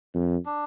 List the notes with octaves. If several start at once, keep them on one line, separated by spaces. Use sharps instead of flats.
F2
D4